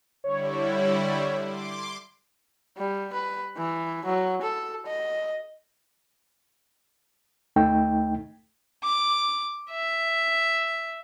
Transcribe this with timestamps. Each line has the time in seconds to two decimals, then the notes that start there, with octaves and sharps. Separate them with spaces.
0.24 D3 G3 E4 C#5
1.46 C6 D6
2.78 G3
3.13 B4
3.56 E3
4.05 F#3
4.42 A4
4.86 D#5
7.56 D2 A3 D#4 G5
8.83 D6
9.71 E5